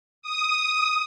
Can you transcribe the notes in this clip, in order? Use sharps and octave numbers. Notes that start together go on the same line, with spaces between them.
D#6